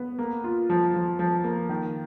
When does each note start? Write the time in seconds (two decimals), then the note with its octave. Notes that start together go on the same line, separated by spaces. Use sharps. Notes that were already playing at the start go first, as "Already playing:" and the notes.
Already playing: B3
0.19 A#3
0.44 F4
0.70 F3
0.94 F3
1.19 F3
1.44 A#3
1.69 D#3